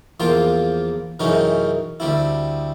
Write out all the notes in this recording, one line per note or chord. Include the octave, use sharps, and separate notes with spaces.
E2 F3 A#3 F4 C5 G5
F#2 C3 E3 G#3 C#4 D#4
D2 G3 C4 E4